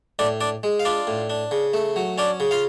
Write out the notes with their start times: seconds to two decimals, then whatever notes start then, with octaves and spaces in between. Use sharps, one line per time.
0.19 A2 D4 D5
0.41 D4 D5
0.63 G#3
0.80 F5
0.85 D4 F4 D5
1.07 A2
1.30 D4
1.51 C#3
1.74 A3
1.96 F#3
2.18 C#4 D4 D5
2.40 C#3
2.51 F4 F5